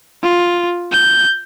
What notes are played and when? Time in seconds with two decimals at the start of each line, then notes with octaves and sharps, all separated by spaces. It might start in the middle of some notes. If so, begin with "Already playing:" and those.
0.23 F4
0.92 G6